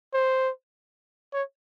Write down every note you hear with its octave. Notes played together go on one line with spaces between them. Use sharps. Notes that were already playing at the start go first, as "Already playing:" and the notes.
C5
C#5